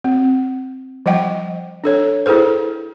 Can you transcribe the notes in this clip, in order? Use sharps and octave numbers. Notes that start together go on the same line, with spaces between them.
C4
F3 G3 D#5 F#5 G5
D4 A4 C#5
E4 G#4 A4 B4 C5